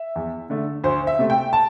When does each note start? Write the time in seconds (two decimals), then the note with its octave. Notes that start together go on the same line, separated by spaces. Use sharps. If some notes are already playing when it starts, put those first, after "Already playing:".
Already playing: E5
0.16 E2
0.50 D3 A3
0.84 D2 C5
1.07 E5
1.19 C3 A3
1.30 G5
1.53 A5